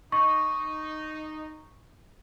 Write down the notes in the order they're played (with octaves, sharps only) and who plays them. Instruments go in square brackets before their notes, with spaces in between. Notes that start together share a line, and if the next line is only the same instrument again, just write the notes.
[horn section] D#4 [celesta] C#6